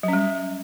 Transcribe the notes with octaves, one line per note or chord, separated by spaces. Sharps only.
F#3 G3 C#4